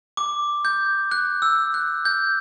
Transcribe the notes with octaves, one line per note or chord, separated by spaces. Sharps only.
D6
G6
F#6
E6
F#6
G6